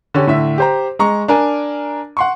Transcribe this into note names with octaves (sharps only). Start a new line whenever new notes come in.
D3 C#4 G4
A2 D3 E5
G4 C5 A#5
G#3 A#5 C#6
D4 A#4 G#5
F#5 C6 C#6